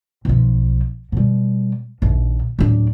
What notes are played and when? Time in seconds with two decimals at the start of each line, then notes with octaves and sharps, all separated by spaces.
0.25 B1 F3
1.12 B2 G3
2.02 A#1 D#2
2.59 D1 D4